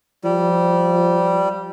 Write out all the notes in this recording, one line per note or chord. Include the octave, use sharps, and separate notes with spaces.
F3 G3